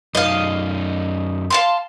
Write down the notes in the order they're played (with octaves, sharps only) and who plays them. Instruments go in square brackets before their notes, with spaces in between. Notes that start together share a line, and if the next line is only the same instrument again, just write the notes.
[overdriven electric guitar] F#2 D#4 [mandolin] D#5 F5
[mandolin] F5 A5 C6